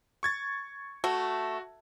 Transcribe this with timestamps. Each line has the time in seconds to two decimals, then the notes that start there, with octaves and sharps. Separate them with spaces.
0.23 C#6 G#6 A6
1.04 A3 F#4